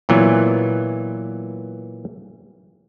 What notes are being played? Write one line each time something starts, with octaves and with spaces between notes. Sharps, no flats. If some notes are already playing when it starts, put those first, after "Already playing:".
A#2 E3 F#3 B3